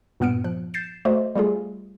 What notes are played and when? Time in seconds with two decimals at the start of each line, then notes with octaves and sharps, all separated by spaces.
0.20 G2 A#2 B3 F6 C#7 D7
0.44 F3 F#6
0.74 G6 A6 C7 E7
1.05 A3 F#4 C5 D5 D#5
1.35 G3 A3 F4 G#4